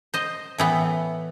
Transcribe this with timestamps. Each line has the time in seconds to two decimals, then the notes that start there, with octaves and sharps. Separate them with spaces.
0.14 C5 D#5
0.58 A2 E3 B3